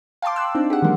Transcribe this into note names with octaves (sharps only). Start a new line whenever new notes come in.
F5 G5 A5 C6 D6
E6 F#6
C4 D4 D#4
G4 G#4 F#5
D#3 E3 F#3 G#3 A#3